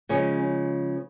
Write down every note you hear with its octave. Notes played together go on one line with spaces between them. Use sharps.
C#3 F3 G#3 C#4